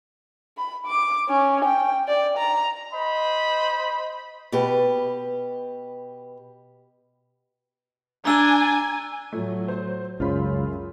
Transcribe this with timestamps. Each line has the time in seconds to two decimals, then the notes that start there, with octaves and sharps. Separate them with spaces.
0.58 B5
0.86 D6
1.29 C#4
1.65 G5
2.08 D5
2.38 A#5
2.93 C5 D#5 B5
4.52 B2 G4 B4
8.25 D4 G#5 A#5 E6 G7
9.33 A2 F3 F#3 A3
9.68 C5
10.20 C#2 F#2 C#3 F4 B5 C6